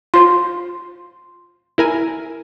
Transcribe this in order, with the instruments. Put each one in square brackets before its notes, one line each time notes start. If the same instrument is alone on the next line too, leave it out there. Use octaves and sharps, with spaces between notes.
[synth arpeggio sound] F4 C5 [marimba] C6
[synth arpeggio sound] E4 A#4 G#5